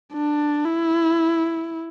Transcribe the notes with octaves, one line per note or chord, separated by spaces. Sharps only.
D4
E4